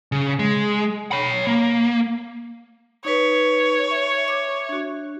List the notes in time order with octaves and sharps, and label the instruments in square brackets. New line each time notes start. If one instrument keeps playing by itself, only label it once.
[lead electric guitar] C#3
G#3
C#5 B5
A#3
[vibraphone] D#4 B4 [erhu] C#5
[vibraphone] E5
E5 D6
D4 F#4